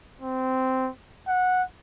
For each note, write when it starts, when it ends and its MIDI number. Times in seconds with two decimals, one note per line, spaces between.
0.22 0.90 60
1.28 1.63 78